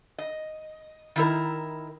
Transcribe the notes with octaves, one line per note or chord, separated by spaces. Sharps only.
D#5
D#3 E4 A#4